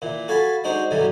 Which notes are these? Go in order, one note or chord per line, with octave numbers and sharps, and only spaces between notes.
A#2 E3
F#4 A4 F5 G#5 A5 B5
G#3 D4 D#4 F#4 C5
G2 B2 D3 E3 F#3 G3